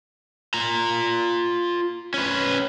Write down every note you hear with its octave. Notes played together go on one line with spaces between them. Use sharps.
F4 A#5
C#4 B4